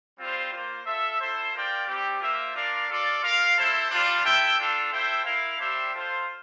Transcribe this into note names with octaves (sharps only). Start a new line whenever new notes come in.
G3 C4 F4 C5
A#3 F4 C5
F4 A4 E5
E4 A4 C5
F4 A#4 D5 G5
G3 C4 G4
A#3 F4 C5 E5
D4 F4 A#4 D5 F5
F4 A4 D5
F4 A#4 F5
E4 A4 C5
G3 D4 F4
E4 A4 E5 G5
D4 F4 A4
E4 A4 C5 E5 G5
E4 A#4 F5
G3 D4 G4 C5 E5
F4 A4 C5